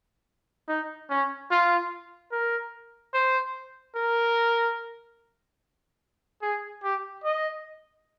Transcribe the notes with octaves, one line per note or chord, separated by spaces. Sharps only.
D#4
C#4
F4
A#4
C5
A#4
G#4
G4
D#5